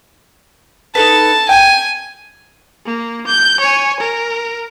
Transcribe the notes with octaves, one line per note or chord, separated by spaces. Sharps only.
D#4 A4 B4 A5
G5 G#5
A#3
G6
C#5 G#5
A#4